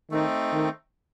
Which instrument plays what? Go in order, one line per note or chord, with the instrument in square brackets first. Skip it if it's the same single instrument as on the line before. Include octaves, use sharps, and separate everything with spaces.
[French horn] D#3 [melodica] A3 C4 D#4
[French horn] D#3